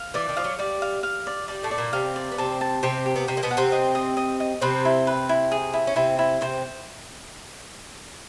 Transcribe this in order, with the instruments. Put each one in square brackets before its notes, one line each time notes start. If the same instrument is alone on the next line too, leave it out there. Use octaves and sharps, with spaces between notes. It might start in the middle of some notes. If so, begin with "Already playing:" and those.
Already playing: [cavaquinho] F5
[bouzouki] E3 [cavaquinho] D5
[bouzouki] D#3
[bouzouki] F3 [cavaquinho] F5
[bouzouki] F#3
[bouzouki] G3 [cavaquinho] D5
[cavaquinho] F5
F5
D5
[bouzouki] G3 [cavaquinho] D5
[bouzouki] A2 A3
[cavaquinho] D5
[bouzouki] A#2 A#3
[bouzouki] C3 C4 [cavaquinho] F5
[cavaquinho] D5
[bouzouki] B3
[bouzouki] C3 C4 [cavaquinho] A5
[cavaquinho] A5
[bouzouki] C3 C4 [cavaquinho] G4
[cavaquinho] G4
[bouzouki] B3
[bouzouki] C3 C4 [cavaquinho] C5
[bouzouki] A#3
B2 B3
[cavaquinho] F#5
[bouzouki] C3 C4
[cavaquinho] D#5
D#5
D#5
D#5
[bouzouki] C3 C4 [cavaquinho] B4
[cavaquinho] E4
B4
E4
G#4
E4
[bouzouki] C#4
[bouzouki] C3 C4 [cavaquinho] E4
[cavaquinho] E4
[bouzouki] C3 C4 [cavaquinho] C5